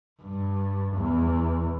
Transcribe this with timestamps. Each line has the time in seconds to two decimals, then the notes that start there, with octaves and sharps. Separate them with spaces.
0.22 G2
0.97 E2